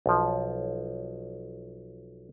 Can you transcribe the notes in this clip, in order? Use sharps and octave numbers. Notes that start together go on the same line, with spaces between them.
B1 F3